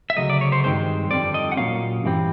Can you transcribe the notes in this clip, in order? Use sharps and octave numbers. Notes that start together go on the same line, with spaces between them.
E5
D2 C#3 F#3 D#5
D5
C#5
C5
G2 D#3 G#3 C4 C5
F2 D3 G3 C4 D5
D#5
F#5
A#2 F#3 A#3 C#4 F5
G2 E3 G3 C4